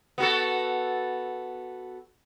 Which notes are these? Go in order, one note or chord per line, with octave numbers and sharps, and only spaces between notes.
B3 F#4 A4